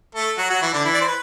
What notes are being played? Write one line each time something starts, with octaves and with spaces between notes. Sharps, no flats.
A3 A4
F#3 F#4
F#3 F#4
E3 E4
D3 D4
E3 E4
D5
C5
B4